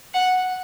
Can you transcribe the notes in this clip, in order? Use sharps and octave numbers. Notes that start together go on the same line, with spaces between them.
F#5